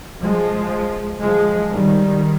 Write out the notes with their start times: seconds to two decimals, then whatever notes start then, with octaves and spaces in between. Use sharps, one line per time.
0.22 F3 G#3
1.22 F3 G#3
1.72 D#3 G3